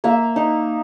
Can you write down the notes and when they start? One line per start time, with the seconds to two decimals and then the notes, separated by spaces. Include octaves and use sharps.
0.04 A#3 E5
0.36 D#4